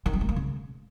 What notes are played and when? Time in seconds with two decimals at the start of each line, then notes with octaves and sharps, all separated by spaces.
0.06 D#3
0.13 F#3
0.21 A3
0.29 A#3
0.36 C#3